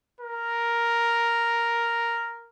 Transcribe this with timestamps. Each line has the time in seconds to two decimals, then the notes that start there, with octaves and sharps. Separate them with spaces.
0.20 A#4